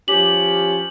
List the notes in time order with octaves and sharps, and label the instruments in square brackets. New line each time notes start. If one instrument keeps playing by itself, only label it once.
[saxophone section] F3 C#4 G4 [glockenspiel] F#7